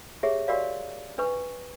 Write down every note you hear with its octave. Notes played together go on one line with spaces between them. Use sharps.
G4 G#4 C#5 E5
F#4 G4 A#4 C#5 D5 F5
D4 B4 C#6